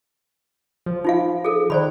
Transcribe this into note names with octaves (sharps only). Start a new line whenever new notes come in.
F3
D#4 F4 F5
G#4 A4
D#3 C5 D5 B5